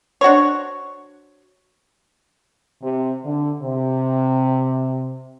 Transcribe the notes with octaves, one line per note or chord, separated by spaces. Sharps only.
D4 F#4 C5 C#5
C3
D3
C3